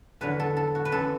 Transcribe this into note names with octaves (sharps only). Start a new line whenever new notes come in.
E2 D3 F#3 B4
A4
A4
F#4
B4
F#2 E3 A4